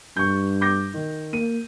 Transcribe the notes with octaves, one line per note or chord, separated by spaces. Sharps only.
G2 C#6 G6
D6 G6 A#6
D#3
A#3 D#7